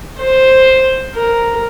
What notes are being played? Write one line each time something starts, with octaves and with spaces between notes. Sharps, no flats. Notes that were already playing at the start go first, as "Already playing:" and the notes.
C5
A#4